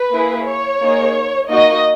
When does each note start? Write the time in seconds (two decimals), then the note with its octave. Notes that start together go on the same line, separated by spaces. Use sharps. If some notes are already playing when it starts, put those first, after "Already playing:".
Already playing: B4
0.12 A#3 E4 G#4
0.46 C#5
0.81 A#3 D#4 G#4
1.49 A#3 D#4 F#4 D#5